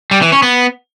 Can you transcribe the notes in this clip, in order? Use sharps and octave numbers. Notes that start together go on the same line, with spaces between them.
G3
E3
C#4
B3